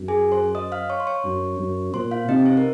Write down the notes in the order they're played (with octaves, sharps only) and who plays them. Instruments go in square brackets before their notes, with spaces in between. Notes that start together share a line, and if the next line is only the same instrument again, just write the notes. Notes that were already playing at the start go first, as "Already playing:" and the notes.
Already playing: [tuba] F#2
[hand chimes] G#4 G#5
C5 C6
D#5 D#6
F5 F6
C#5 C#6
C6
C#5 C#6
[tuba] F#2
F#2
[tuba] A#2 [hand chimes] C5 C6
[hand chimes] F4 F5
[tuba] C3 [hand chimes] D#4 D#5
[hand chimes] C4 C5
A#4